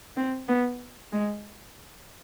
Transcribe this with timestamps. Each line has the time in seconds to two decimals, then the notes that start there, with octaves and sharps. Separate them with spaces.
0.17 C4
0.48 B3
1.13 G#3